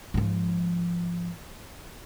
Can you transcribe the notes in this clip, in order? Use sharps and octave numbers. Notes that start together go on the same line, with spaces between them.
G#2 F3